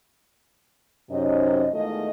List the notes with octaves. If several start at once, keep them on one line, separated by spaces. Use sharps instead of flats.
F#2 C3 C4 C#4 D#4 D#5
E2 D#3 G#3 A3 F4 D#5